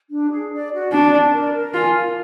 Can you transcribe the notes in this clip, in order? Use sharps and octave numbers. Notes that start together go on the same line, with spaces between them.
D4
G#4
D5
F#4
D4 D5
D5
A#4
A#4
F4 G#5
F5